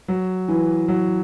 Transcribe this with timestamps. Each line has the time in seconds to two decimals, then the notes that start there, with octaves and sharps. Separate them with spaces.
0.08 F#3
0.48 E3
0.88 F#3